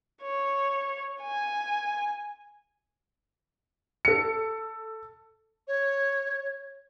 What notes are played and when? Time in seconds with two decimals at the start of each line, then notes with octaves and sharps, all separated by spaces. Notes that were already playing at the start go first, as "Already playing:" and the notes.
0.22 C#5
1.21 G#5
4.05 A4 C#7
5.68 C#5